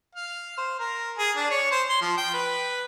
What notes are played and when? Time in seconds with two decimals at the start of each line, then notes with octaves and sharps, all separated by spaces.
0.15 F5
0.57 C5
0.80 A#4
1.18 G#4
1.37 D4
1.51 C#5
1.71 C5
1.90 C6
2.01 F3
2.18 G5
2.34 B4